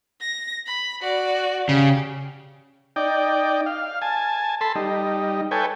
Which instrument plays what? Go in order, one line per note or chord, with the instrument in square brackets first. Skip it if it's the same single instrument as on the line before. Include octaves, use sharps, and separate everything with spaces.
[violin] A#6
B5
F#4 D5
[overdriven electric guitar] C#3 [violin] G4
[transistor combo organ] D#4 D5 G5
F5
G#5 A5
A4 A5 B5 C6
G3 D#4
A4 B4 C#5 G5 G#5